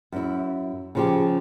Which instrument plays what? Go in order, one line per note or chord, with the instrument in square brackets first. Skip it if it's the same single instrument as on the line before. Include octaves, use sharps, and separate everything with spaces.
[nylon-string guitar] F#2 E4
C#3 F3 G4